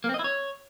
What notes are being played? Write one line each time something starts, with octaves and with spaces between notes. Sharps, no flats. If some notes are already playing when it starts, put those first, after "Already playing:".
A#3
C4
D#5
E4
C#5